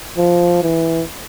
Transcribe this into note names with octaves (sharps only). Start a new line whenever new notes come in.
F3
E3